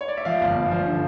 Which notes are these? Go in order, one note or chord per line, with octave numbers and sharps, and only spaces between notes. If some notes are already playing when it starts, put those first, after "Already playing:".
C#5
D5
E5
F3 D5 F5
G1
G1
F3
D3